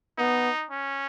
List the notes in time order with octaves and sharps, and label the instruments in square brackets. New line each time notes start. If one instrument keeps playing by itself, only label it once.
[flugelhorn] B3 [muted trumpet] D#4
[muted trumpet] C#4